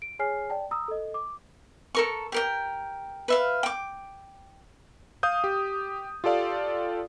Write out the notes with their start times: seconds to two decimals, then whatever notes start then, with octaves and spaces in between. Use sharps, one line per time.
0.02 D7
0.19 G#4 C#5 G#5 F6 C7
0.50 D5 G5 A5
0.71 A#5 D#6 E6
0.88 A4 D#5
1.14 D6
1.95 A4 A#4 C#6
2.32 G4 A#4 G5
3.28 B4 E5 F5
3.63 G5 D6
5.23 F5 D#6 G6
5.44 G4
6.24 F4 G4 A4 D5 F5